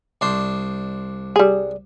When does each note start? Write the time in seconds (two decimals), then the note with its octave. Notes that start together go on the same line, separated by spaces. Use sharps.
0.21 C2 D4 C5
1.36 G3 G#4